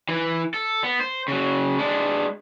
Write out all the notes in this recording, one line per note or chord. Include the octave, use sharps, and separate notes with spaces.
E3
A4
B3
C5
C#3 F#3
G#3 D4